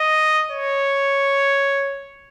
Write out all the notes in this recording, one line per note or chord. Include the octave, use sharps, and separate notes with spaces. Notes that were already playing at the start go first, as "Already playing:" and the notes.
Already playing: D#5
C#5